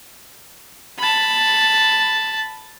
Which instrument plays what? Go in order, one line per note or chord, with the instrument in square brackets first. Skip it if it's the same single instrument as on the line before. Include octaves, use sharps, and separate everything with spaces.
[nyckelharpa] A5 B5